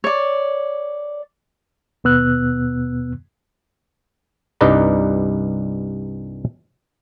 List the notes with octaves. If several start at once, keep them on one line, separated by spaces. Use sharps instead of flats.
C#5 D5
D#2 B2 B3 E6 F#6
C2 G2 D#4 B4 D5 A#5